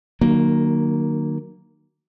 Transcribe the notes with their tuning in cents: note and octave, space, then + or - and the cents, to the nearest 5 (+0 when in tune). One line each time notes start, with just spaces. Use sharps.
D#3 -35 F#3 +0 A#3 +0